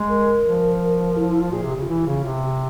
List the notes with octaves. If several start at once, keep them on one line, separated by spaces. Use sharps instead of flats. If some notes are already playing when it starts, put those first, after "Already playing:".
Already playing: G#3
A#4
F3
E4
E4
F4
A#2 G#4
C3
G4
C#3
F4
E3 E4
C#3 F4
C3 G4